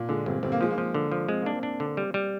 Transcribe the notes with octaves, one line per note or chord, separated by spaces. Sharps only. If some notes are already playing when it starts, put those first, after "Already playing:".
Already playing: A#2
D3 G#3
G1 C4
G1 C4
A#3
F3 G#3
A#3
F3
D3
F3
G#3 C4
A#3 D4
C4
D4
D3
G3
G3